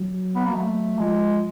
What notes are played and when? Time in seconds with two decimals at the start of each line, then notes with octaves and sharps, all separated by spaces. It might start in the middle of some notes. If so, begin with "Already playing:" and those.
Already playing: F#3
0.35 B3
0.45 A#3
0.55 F#3 A3
0.99 F3 G#3